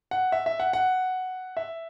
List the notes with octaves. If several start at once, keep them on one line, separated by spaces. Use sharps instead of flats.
F#5
E5
E5
F#5
F#5
E5